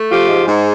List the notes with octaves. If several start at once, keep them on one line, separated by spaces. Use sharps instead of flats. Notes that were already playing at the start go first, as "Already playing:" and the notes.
Already playing: A3
F3 F4 G4
G#2
G#2